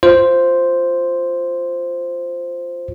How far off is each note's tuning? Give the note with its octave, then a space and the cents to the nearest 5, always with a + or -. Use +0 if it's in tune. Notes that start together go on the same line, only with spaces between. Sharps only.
F4 +0 C5 +0